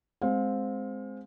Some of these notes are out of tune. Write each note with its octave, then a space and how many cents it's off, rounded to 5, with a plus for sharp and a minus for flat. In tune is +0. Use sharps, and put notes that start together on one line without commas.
G#3 +0 C4 +0 F5 +30